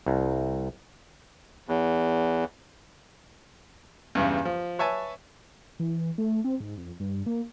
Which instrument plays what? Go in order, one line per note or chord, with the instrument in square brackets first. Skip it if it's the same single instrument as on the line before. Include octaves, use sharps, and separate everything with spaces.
[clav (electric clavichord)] C2
[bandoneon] E2
[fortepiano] E2 G2 C#3
F3
B4 C#5 E5 G#5 A5
[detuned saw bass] E3
A3
C4
G#2
F2
G2
A#3